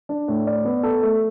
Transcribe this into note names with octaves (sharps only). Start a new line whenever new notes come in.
D4
A2
D5
B3
A4
A3